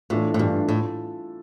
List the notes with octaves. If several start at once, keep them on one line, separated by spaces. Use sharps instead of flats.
A2 E3 A3 D4 F4
A2
G2 E3 A3 D4 F4
A2 F4 A4